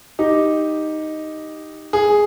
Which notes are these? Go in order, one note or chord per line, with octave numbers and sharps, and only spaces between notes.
D#4 G4
G#4